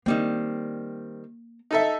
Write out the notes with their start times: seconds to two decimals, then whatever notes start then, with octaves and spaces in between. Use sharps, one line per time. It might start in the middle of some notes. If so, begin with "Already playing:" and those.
0.06 D#3 G3 A#3 C4
1.71 D#4 A4 E5